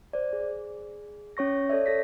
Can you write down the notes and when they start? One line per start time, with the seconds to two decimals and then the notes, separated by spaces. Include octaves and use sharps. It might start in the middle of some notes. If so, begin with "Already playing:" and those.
0.13 C5 D5
0.33 G#4
1.37 C#4 C#5 C#6 A#6
1.69 A4 C#5 D5 E5
1.86 A4 A#6 B6